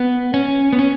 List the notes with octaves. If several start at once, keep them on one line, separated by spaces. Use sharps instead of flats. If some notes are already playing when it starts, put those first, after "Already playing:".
Already playing: B3
C#4
B3
C#4